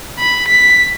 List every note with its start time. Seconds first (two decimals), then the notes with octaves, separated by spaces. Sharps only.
0.19 B5
0.48 B6